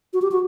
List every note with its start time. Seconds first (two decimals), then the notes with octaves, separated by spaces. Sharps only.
0.13 F#4
0.22 G4
0.32 F#4